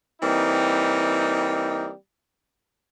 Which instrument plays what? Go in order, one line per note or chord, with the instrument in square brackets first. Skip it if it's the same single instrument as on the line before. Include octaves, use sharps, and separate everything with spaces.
[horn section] E3 G3 A#3 C4 D#4